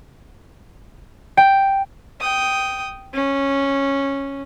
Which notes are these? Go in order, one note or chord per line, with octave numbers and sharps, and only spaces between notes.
G5
G5 D#6
C#4